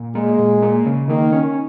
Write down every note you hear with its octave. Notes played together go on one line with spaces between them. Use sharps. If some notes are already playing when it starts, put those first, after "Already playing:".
Already playing: A#2
G#3 A#3
A#2
A#3
C#3
D#3 A#3
C#4